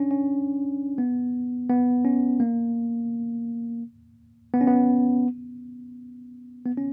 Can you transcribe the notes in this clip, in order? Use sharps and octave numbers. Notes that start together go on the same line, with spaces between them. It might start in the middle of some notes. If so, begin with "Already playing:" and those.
Already playing: C#4 D4
C#4
B3
B3
C#4
A#3
B3
C#4
B3
B3
C#4